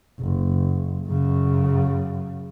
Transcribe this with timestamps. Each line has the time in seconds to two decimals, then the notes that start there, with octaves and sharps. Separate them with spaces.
0.20 F#1
1.07 F#2 C#3